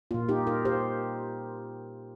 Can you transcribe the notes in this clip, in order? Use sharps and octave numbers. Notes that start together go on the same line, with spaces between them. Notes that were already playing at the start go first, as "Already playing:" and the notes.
A#2 A#3 F4
D#4 G4
F4 A#4
G4 C5